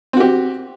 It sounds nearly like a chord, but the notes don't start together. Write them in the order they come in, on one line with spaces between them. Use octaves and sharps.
C4 F#4 G4